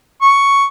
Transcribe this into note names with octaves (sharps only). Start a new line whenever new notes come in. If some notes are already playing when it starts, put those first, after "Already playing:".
C#6